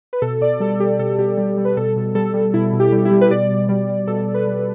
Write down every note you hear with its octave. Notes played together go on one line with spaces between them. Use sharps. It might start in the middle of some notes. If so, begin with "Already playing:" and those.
B4
B2 A4
B2 D5
G3 A4
G3 G4
B2 A4
B2 G4
G3 G4
G3
B4
B2 A4
B2
G3 A4
G3
B2 E4
B2
G4
G3
E4
G3
B4
B2 D5
B2
G3
G3
B2 A4
B2
B4
G3